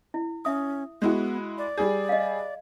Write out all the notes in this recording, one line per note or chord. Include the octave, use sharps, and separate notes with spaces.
E4
C#4 E5 D#6
G#3 B3 E4 F#4
D5
G3 G#4
D#5 F5